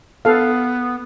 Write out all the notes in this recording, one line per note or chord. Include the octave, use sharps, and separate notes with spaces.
B3 A4 F5